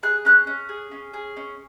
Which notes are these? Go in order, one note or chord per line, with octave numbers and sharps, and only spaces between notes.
G#4 F#6
C#4 F#6
C#4
G#4
C#4
G#4
C#4